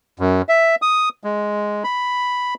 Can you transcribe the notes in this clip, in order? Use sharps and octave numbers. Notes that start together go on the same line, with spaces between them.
F#2
E5
D#6
G#3
B5